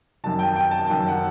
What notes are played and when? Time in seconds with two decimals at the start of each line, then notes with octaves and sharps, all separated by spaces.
0.24 F#2 D#3 F#3 A5
0.39 G5
0.56 G5
0.71 A5
0.87 F#2 D#3 F#3 G5
1.08 F#5